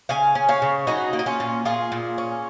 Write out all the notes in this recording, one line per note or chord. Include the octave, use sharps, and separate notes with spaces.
C#3 F5 G#5
C#4
C#5 F5
C#3
F#3 D#4 F#4
A#3
D#4
C#4 F4
A#2
A#2 F4 G#4
A#2
C#4